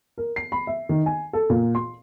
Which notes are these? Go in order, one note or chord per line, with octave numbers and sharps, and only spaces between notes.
A#4
C7
B5
E5
D#3
G#5
A4
A#2
C6